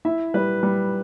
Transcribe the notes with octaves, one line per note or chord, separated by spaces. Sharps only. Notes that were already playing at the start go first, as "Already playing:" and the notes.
E4 E5
G3 B4
G3